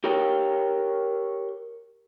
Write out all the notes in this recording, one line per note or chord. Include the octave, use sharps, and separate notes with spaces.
G4 A#4 C#5 G5